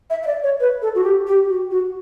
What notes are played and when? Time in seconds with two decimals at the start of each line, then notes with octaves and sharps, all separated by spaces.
0.10 E5
0.23 E5
0.27 D5
0.43 C#5
0.60 B4
0.82 A4
0.95 F#4
1.04 G4
1.27 G4
1.49 F#4
1.71 F#4